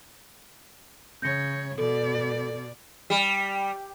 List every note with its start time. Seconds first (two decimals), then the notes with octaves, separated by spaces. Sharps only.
1.22 C#3 C#5 G6 A#6 C#7
1.78 B2 A4 D5
3.10 G3